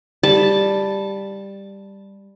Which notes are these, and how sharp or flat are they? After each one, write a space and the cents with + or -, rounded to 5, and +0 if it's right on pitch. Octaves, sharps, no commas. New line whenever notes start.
G3 +10 A5 +0